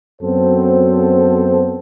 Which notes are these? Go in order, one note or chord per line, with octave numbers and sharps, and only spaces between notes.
F#2 F#3 B3 C4 A4 C5